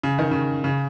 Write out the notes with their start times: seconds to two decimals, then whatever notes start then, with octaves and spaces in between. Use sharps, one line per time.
0.03 C#3
0.19 D#3
0.31 C#3
0.64 C#3